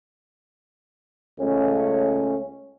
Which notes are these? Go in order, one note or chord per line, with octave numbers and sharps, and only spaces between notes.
C#2 A3 C#4